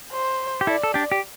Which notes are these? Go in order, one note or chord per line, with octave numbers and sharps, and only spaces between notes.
C5
G4
E4 A4 D5
A4
D4 G4
G4